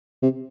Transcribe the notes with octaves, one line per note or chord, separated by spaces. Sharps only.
C3